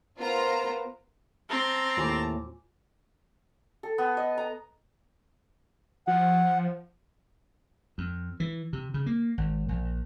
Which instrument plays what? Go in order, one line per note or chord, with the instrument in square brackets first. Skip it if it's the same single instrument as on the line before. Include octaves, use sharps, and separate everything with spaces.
[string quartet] B3 A#4 C5 [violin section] F4 A#5
[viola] C4 [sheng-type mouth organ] A5 A#5
[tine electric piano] D#2 A2 [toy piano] F4 G#5 D6
[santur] A4
B3
D#5
A#5
[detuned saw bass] F3 [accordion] F#5
[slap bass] F2
E3
C3
C#3
A#3
G#1
A#1